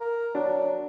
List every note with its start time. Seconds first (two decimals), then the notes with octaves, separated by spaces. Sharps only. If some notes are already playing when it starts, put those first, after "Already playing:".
0.01 A#4
0.35 F#3 D4